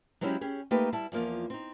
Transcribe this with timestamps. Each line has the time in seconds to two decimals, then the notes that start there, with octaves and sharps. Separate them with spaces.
0.21 F#3 G#3 C4 C#4 E4 G4
0.41 C#4 G4 G#4
0.71 A3 A#3 D#4 G4 A4 B4
0.93 G3 E4 A5
1.12 E2 F3 A#3 F4
1.50 C4 D#4